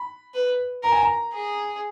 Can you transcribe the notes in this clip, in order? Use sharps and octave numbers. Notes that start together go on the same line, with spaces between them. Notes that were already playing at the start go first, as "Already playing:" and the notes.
Already playing: B5
B4
A#4 A#5
G#5
A#5
G#4